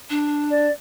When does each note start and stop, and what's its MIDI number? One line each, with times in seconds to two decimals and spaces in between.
0.10 0.67 62
0.51 0.72 74